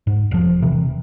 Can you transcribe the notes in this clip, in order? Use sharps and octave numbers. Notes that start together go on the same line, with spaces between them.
G#2
E1 F3
E1 C3 E3